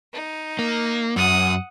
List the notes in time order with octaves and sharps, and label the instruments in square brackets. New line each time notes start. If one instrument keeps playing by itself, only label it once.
[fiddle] D#4
[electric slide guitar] A#3
[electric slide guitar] F#2 [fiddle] F#5 D#6